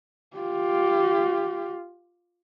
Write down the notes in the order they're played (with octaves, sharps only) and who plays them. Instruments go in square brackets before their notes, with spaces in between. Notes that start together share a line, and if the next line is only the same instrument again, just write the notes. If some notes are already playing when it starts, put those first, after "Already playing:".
[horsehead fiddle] F4 G4